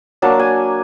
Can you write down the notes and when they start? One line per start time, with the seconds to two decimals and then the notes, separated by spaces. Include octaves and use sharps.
0.22 F#3 A#3 D4 A5
0.39 G#5